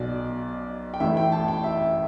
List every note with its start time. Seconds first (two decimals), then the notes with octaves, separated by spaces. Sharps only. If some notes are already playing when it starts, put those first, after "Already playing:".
Already playing: B1 B2 D5
0.94 G5
1.00 A1 A2 E3 E5
1.17 G5
1.32 A5
1.48 G5
1.64 E5